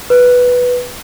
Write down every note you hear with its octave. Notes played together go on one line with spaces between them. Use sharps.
B4